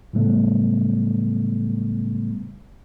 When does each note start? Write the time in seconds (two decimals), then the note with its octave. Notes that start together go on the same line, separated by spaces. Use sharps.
0.13 A2 C#3 F#3 G3 A3 B3